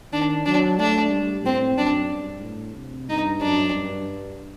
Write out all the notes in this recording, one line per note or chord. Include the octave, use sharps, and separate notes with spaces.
D#3 D4
F#3 D4
A3 D4
G3
A2 C4
F#2 D4
G2
A2
C3
G2 D#4
F#2 D4
G2